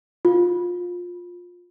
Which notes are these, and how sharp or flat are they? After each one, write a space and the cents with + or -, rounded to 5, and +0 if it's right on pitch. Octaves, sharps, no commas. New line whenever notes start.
F4 +20